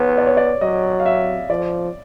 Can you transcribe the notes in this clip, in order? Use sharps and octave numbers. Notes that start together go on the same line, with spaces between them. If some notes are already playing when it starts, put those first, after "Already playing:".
Already playing: B3 C#5
D5
C#5
D5
F#3 D#5
F5
E5
F3 D5